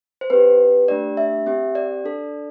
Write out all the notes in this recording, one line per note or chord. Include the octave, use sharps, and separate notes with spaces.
C5
C4 G4 B4
A3 D4 G4 D5
E5
C4 G4 E5
D5
D4 A4